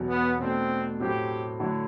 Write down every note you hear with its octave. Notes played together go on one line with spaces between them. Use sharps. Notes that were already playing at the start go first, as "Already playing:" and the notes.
Already playing: E2 B2 F#3
B3
B2 A3 C4 D4
A2 F#3 A3 C4 E4 G4
D3 F#3 A3 E4